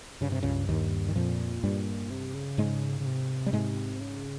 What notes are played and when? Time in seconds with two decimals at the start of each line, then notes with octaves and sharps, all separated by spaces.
0.21 G2 C#3
0.32 C3
0.43 C#2 C#3
0.69 D#2 D#3
1.09 D#3
1.16 F2 A#2 F3
1.64 G2 G3
2.10 C3
2.34 C#3
2.58 G#2 G#3
3.00 C#3
3.06 C3
3.46 G3
3.53 G#2 G#3
4.01 C#3